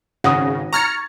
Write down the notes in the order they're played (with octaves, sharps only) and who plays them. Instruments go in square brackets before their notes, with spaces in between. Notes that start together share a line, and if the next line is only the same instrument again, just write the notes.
[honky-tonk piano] G#1 A#6 [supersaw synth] C#3 [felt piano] F#5 D#6
[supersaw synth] A#5 F6 C#7 [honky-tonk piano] C#6 G#6 A6